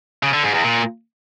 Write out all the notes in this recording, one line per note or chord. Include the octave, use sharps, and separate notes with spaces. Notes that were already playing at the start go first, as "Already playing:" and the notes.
C#3
D3
G#2
E2
A#2